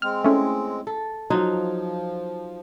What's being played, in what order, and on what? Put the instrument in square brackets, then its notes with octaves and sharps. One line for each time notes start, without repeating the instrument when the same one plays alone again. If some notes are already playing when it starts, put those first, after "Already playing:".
[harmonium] G#3 C4 [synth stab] F6
[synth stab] A3 C#4 E4
[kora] A4
[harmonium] F3 [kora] F#3 D#4 F4